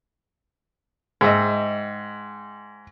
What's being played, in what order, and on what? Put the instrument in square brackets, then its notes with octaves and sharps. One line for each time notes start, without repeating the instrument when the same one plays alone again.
[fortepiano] G#2 [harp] D#5 E5 G5